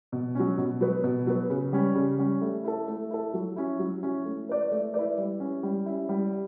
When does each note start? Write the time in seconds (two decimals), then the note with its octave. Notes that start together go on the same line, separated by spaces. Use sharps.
0.12 B2
0.35 F#3 C#4
0.58 B2
0.81 F#3 B3
1.03 B2
1.27 F#3 B3
1.50 C#3
1.73 G3 C#4
1.95 C#3
2.19 G3 C#4
2.41 A3
2.64 E4 A4
2.88 A3
3.11 E4 A4
3.34 F#3
3.56 C#4 E4
3.79 F#3
4.03 C#4 E4
4.25 A3
4.48 E4 B4 D5
4.71 A3
4.94 E4 B4 D5
5.18 G3
5.40 C#4 E4
5.63 G3
5.86 C#4 E4
6.09 G3